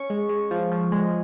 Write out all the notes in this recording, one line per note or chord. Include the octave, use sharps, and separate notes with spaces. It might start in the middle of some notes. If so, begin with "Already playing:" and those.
Already playing: C#4 C#6
G#3
G#3
F3
F3
G#3